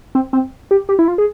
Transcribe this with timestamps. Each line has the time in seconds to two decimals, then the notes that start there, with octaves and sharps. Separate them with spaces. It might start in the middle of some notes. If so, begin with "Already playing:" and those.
0.15 C4
0.33 C4
0.71 G4
0.89 G4
0.99 E4
1.08 F4
1.18 G#4